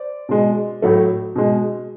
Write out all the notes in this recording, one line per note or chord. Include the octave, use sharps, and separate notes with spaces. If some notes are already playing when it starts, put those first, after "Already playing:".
Already playing: C5 D5
B2 G#3
A2 F#3 A3
B2 G#3